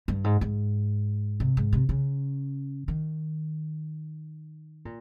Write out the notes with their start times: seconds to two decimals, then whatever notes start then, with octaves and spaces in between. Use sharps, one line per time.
0.08 G2
0.24 G#2
0.41 G#2
1.40 C3
1.57 G#2
1.73 C3
1.89 C#3
2.88 D#3
4.85 A#2